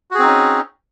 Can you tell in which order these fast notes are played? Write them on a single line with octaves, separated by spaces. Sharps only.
F#4 G#4 C4 D#4 C#4